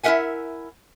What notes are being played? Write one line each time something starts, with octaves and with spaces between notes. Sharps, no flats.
E4 A#4 B4 E5 F#5 G#5